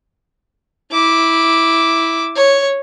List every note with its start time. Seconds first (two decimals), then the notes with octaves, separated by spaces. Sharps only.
0.92 E4 D6
2.36 C#5